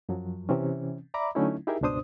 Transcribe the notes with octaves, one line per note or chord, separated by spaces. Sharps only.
F#2 F3 F#3
C3 E3 C4 C#4
D5 E5 A#5 B5 D6
D3 F#3 A3 C#4 D#4 E4
D#4 E4 G4 G#4 A#4 E5
C#2 G2 B2 D4 C5 D#6